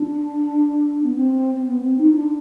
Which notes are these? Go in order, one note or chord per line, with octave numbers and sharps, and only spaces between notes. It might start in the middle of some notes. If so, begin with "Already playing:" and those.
Already playing: D4
B3
C4
C4
B3
C4
D#4
D#4
D4